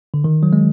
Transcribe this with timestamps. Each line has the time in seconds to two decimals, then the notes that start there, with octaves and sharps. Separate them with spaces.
0.14 D3
0.24 D#3
0.43 F#3
0.53 G#3